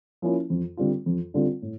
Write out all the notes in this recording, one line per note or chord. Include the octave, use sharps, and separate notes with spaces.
F3 A#3 C#4 E4
F2
D3 G3 C4 F4
F2
D3 G3 C4 F4
A2